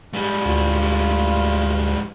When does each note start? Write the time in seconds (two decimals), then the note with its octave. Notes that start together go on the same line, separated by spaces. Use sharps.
0.13 G#2 G3
0.46 D2 F4